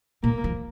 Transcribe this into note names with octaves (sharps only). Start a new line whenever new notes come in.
A#2 A#3
F3